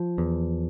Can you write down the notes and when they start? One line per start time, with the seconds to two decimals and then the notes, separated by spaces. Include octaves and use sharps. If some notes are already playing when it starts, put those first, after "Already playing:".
Already playing: F3
0.18 E2